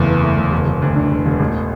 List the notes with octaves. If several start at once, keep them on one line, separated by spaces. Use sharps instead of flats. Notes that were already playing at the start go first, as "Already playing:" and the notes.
Already playing: F#1 E2 A3
E3
A3
F#1
E1
E1
D2
D3
E1
E1
A1